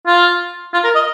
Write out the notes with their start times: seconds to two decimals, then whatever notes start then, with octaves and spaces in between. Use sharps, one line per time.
0.07 F4
0.73 F4
0.84 A#4
0.95 D#5